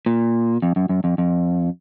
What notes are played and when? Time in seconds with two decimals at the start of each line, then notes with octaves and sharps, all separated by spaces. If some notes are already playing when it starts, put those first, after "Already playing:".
0.06 A#2
0.62 F2
0.76 F#2
0.89 F#2
1.04 F2
1.18 F2